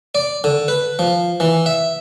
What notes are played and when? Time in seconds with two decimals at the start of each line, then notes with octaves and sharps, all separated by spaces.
0.15 D5
0.44 D3
0.68 B4
0.99 F3
1.40 E3
1.66 E5